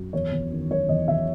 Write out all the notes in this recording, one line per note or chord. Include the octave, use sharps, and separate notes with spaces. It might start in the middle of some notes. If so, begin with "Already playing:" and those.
Already playing: F#2
E2 C#5
E2
D#3
F#3 C#5
E2 D#5
E2 E5